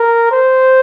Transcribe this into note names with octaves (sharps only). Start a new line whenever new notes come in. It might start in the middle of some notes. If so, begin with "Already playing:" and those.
Already playing: A#4
C5